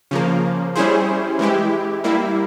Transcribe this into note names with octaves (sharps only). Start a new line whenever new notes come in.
C#3 F3 A#3
G3 C#4 E4 G#4 C5
E3 G#3 E4 G4
G3 A#3 E4